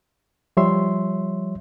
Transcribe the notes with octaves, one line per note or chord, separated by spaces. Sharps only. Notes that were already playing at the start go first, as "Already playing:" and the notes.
F3 G3 C#5 E5 C6